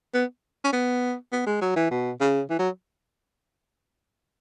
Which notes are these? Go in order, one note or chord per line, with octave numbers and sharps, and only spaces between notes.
B3
C#4
B3
B3
G#3
F#3
E3
B2
C#3
E3
F#3